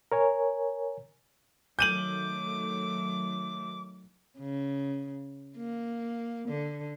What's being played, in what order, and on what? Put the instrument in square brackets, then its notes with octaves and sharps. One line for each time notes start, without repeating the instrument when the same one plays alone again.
[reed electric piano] A#4 C#5 G#5
[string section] D#3 F#3 A3 [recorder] D6 [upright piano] G6 D#7 F#7
[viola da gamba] C#3
A#3
D3